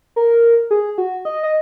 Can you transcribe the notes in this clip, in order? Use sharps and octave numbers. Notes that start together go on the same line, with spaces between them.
A#4
G#4
F#4
D#5
D#5